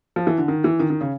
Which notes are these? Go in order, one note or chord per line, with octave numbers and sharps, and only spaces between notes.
F3
E3
D3
D#3
E3
D#3
D#3
C#3